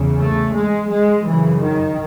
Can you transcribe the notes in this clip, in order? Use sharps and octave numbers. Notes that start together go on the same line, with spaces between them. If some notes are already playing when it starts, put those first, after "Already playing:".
Already playing: E2 C#3
A3
G#3
G#3
F#2 C#3 E3
D#3